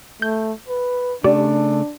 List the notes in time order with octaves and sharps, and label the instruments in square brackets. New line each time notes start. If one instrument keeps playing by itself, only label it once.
[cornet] A3 [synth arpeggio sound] G6
[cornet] B4
[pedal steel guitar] C#3 A3 [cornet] D4 [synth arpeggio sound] G4 D5